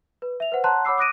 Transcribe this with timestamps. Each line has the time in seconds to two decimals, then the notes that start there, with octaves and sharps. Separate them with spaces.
0.22 B4
0.40 E5 F7
0.52 B4 C5 F#5
0.64 C#5 F#5 A5 A#5 C6 F#6
0.85 C#5 F#5 B5 D6 E6 C7
0.98 D6 D#6 F#6 A#6 D7 D#7